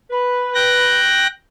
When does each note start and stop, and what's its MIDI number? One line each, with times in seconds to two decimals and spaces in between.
0.11 1.03 71
0.55 1.27 79
0.55 1.27 90
0.55 1.27 94